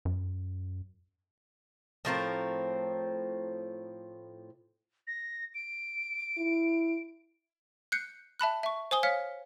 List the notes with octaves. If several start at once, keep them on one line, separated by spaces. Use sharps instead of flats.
F#2
A2 F3 C4 A#4
A#6
D7
E4
F#6 G6 C7 C#7
E5 A5 B5 F#6
E5 C#6
C5 G#5 D#6 G7
C#5 F5 F6 B6 C#7